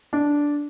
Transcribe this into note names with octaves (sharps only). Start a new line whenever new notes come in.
D4